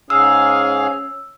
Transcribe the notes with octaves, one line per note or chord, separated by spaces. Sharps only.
G#2 C#4 G#4 F5 E6